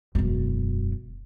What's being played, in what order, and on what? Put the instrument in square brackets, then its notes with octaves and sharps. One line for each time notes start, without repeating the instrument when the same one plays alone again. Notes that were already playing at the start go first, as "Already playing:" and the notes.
[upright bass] E1 F#2